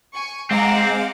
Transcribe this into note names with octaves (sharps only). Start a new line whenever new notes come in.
G#5 C#6
G#3 C4 F5 F#5 A#5 D6